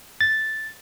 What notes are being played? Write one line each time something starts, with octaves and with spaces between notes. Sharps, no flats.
A6